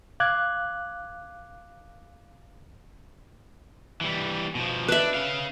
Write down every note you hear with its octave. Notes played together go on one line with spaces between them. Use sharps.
F5 D6 F#6 G#6
E3 G3
B2 F3
D4 B4 E5
C#4 F5